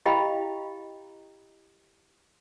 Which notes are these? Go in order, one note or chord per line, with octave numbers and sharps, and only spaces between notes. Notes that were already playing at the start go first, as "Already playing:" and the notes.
E4 G4 D#5 F5 G5 B5